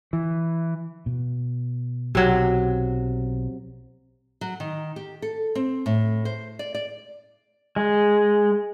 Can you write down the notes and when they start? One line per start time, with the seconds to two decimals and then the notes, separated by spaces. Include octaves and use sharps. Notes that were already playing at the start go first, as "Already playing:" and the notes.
0.13 E3
1.06 B2
2.15 B1 C3 F#3
4.41 F#3
4.60 D#3
4.96 G4
5.22 A4
5.55 C4
5.86 A2
6.25 C5
6.59 D5
6.75 D5
7.76 G#3